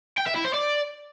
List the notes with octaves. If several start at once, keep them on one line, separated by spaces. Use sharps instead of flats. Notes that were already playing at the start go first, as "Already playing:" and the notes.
G5
E5
E4
C5
D5